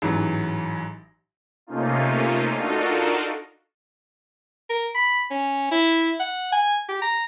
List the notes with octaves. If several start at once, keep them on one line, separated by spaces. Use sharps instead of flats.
A1 G#2 E3 F#3
C3 A3 A#3 C#4 D#4 F4
D4 D#4 F4 F#4 A4 A#4
A#4
B5
C#4
E4
F#5
G#5
G4
A#5